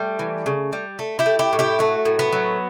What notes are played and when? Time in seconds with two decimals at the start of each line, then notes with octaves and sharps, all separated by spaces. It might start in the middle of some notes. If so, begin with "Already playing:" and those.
Already playing: G3 A3
0.19 E3
0.46 C#3
0.73 G3
0.99 A3
1.19 E4 G4
1.26 A3
1.39 E4 G4
1.53 A2
1.59 E4 G4
1.79 F#3 A3
2.05 A2
2.19 B3
2.32 F#3